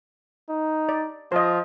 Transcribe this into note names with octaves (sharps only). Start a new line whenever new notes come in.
D#4
D5
F3 C5 D#5